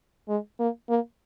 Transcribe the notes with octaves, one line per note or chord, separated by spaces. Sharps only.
G#3
A#3
A#3